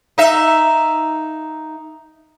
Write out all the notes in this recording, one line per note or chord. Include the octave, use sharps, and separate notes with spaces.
D#4 E5